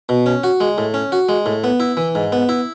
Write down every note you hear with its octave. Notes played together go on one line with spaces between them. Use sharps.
B2
C#4
F#4
G#3
A2
C#4
F#4
G#3
A2
B3
E4
E3
G#2
B3
E4